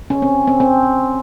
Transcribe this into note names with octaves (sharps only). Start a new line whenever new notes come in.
C#4
C4
C4
C4